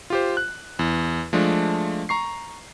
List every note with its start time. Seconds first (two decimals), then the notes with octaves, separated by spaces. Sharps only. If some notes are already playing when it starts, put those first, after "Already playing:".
0.10 F4 G4 C5
0.37 F#6
0.79 E2
1.33 F3 G#3 A3 D4
2.09 A#5 C#6 C7